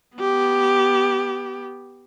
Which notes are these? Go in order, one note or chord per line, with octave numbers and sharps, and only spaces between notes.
B3 G4